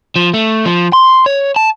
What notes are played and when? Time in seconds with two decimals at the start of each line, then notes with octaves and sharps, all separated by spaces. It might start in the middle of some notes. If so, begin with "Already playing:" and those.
0.16 F3
0.34 A3
0.66 F3
0.93 C6
1.26 C#5
1.56 A5